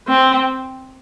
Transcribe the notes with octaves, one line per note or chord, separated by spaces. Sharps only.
C4